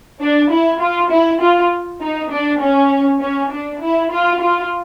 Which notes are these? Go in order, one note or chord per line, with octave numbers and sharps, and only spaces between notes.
D4
E4
F4
E4
F4
D#4
D4
C#4
C#4
D4
E4
F4
F4